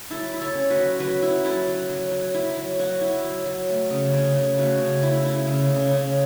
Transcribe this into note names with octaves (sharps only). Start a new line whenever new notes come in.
F#3 E4 A4
E4
A4 C#5
C#4
F#4 B4
F#3
F#3 F#4 B4
E4
F#3 E4 A4
F#3
F#3
F#3
E4
F#3
F#3 F#4
E4
F#3
F#3
A3
C#3
C#3
C#3
A3 F#4
C#3
E4
E4
C#3
C#3
C#3